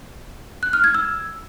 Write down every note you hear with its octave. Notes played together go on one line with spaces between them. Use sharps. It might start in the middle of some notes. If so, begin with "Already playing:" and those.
F#6
F6
G#6
E6